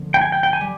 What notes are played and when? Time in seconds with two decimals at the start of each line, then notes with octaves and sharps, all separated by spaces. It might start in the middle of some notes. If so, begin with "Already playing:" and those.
Already playing: D3 F3 A#3
0.14 G5
0.21 G#5
0.32 G5
0.43 G5
0.53 G#5
0.61 G3